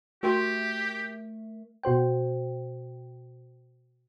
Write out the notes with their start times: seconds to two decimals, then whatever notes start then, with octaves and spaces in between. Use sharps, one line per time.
0.23 A3 F#4 G4 A#4 E5 G5 C6
1.83 B2 F#4 C5 G5